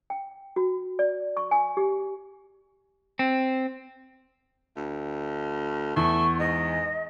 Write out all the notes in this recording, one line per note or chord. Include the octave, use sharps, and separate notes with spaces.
G5
F#4
D5
C#6
G#5
G4
C4
D2
E2 A3 C#6
G#2 D#5